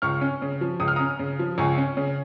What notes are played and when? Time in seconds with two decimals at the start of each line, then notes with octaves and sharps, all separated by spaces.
0.02 C#2 C#6 F6
0.21 C#4
0.42 C#3
0.61 F3
0.80 C#2 D#6
0.88 F6
0.96 C#4 A#5 D#6
1.19 C#3
1.39 F3
1.58 C#2 G#5 C#6
1.77 C#4
1.97 C#3